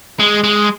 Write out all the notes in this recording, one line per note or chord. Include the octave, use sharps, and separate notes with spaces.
G#3
G#3